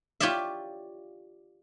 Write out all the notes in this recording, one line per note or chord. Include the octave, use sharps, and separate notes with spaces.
F4 G4 C#5 D5 E5